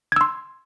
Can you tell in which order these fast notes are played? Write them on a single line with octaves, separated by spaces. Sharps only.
G#6 E6 C6